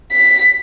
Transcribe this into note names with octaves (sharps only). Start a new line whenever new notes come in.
B6